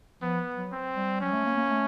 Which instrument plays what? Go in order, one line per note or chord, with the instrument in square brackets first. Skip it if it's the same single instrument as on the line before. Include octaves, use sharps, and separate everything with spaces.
[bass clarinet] F3 [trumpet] B3
[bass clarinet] F#3
[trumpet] C4
[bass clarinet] G3
[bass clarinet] F#3 [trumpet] C#4
[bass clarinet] A3
A#3
A#3
A3